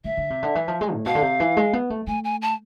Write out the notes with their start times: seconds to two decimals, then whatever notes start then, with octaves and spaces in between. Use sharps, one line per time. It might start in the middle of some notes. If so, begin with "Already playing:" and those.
0.04 D3 E5
0.17 D3
0.30 C3
0.43 D3
0.55 E3
0.68 F3
0.81 G#3
0.94 A2
1.06 B2 F5
1.15 D3
1.22 C3
1.40 E3
1.57 G#3
1.73 B3
1.90 A3
2.07 A3 G#5
2.24 G#5
2.42 A5